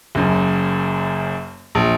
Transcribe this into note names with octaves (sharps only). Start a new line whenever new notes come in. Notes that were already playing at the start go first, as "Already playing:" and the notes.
F#1 F#2
A#1